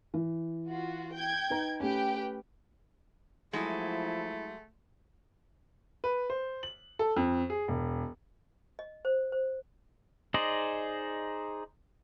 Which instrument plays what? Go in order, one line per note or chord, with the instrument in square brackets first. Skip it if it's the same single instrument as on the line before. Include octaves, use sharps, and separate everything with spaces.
[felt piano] E3
[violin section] F4 F#4
G5 G6 G#6
[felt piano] D#4 B4 A#5
[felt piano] A3 C#4 [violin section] G4 B4 G5
[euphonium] F3 [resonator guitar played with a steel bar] F#3 G#3 [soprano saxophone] A3 [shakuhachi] E4
[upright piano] B4
C5
F#7
A4
F2
G#4
E1
[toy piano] D#5
C5
C5
[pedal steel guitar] D#4 G#4 C5 D5 D#5